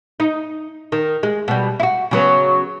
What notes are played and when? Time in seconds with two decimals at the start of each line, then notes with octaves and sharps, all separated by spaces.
0.20 D#4
0.92 D#3
1.23 G#3
1.48 B2 G3
1.80 E4 F#4
2.11 C#3 F#3 B3